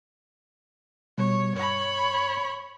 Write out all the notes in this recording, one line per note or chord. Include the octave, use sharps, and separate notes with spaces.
B2 G3 C#5
G2 C#5 B5